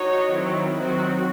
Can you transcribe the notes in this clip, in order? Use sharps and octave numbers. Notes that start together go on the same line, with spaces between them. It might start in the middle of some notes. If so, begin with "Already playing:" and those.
Already playing: D#4 F#4 C#5
D#3 F#3 C4 E4
D#3 F#3 C4 F#4